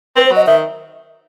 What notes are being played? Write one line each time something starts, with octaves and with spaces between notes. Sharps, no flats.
C4 B4
C5
F#3
D#5
D#3 E5